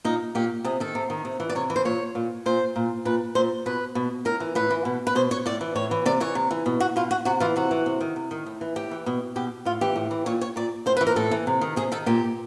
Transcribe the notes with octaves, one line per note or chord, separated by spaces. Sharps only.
A#2 D#4
A#2 G4
C3 G#4
D#3 A4
C3
D#3
C3
E3
D5
C3 C#5
E3
C5
A#2 C#5
A#2
A#2 C5
A#2
A#2 B4
A#2 C5
B2 B4
B2
A2 A#4
E3
A2 B4
E3
B2
B4
B2 C5
C#5
A2 D5
E3
A2 C#5
E3
C3 D5
E3 C#5
C3
E3
B2
F#4
B2 F4
F#4
C3 F#4
E3 F4
C3 F#4
E3
C3
D#3
C3
D#3
A2
E3
A2 G4
E3
B2
B2 G4
A2 F4
E3 G4
A2
E3
A#2 C#5
C#5
A#2 D5
A2 C5
B4
E3
A#4
A2 A4
E3
C3
D#3
C3 G#4
D#3 A4
A#2 G4